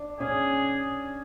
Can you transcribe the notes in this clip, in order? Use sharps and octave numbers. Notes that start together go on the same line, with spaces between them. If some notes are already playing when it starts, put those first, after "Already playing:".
Already playing: D4
C#4 G#4